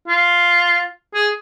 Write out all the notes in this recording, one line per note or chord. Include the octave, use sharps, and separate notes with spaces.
F4
G#4